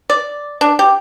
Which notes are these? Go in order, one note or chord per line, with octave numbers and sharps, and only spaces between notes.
D5
D4
G4